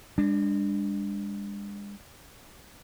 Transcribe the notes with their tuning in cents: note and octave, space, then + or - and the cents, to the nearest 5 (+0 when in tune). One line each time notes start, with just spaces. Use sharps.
G#3 -40 D4 +0